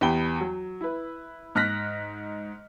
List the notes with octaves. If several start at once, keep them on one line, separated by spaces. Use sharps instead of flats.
E2 G4 G5 B5 G7
F#3
E4 B4
G#2 F6 F#6 A#6 B6